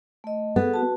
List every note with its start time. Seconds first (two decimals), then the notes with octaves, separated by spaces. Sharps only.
0.24 A3 D#5
0.56 B3 G#4 A4
0.74 F#4 A5